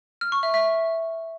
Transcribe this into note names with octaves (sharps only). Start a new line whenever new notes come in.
F6
C#6
E5
E5